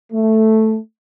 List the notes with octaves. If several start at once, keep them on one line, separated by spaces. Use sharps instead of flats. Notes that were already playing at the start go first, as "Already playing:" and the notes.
A3